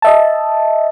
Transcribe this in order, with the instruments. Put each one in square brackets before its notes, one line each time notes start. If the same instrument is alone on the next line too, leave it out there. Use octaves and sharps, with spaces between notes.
[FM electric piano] D#5 E5 A5